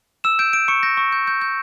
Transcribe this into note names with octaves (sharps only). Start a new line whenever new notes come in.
E6 E7
G6 D7
G6 D7
C#6 C#7
G6 A#6
C#6
G6
G6
G6